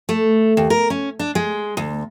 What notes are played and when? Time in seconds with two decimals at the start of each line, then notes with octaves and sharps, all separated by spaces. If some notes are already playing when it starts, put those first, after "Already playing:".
0.09 A3
0.57 D#2
0.70 A#4
0.90 C#4
1.19 D4
1.35 G#3
1.77 D2